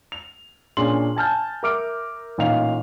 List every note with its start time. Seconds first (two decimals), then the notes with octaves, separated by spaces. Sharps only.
0.12 F7
0.77 A#2 C#4 D4 G#4 C6 F#7
1.16 G#5 A5 F6 G6
1.63 A#4 E5 D6 F6 D7
2.38 A1 A#2 D#4 F5 F7